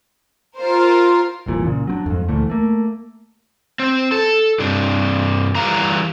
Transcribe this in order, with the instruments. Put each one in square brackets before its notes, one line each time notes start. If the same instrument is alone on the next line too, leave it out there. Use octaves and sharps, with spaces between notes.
[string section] F4 A#4 C5
[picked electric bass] F1 C2 A#2 E3
A#2 C#3
F#3 C4 D4
F2 G#2
D2 A#2 E3 A3
A3 A#3
[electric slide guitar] C4
A4
G2 C3 D4
E3 G3 A4 C#5 F5 A#5